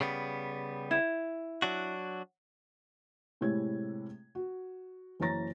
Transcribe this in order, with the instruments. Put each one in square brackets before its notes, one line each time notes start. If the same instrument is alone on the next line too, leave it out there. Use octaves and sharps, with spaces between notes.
[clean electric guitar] C#3 G3 B3
[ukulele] E4
[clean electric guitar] F#3 D4 F#4
[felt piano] A2 C3 G#3 E4 C#5 G#6
F#4
F#1 E3 C#5 A#5 A6 A#6